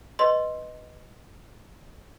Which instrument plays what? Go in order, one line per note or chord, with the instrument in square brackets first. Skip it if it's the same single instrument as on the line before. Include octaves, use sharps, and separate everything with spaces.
[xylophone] B4 D#5 C6